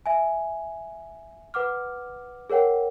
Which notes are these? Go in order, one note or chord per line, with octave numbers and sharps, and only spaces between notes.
E5 G#5
B4 F#5 D6 F6
G#4 A#4 C#5 F#5 G5